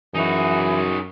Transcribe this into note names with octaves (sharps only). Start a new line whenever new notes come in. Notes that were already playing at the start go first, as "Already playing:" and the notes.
F#2 E3 D#4 F#4 G#4